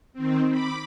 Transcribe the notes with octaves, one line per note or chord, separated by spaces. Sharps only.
D#3 C4
B5 D6